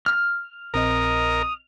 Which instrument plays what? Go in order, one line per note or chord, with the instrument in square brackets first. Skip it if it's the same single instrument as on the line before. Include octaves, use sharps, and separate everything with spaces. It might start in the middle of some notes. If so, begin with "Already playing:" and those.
[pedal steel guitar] F6
[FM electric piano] A#1 C4 D#5 [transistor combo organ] A#4 [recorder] D#6